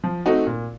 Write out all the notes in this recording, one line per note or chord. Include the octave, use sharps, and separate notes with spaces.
F3
A3 C4 D#4 F#4
A#2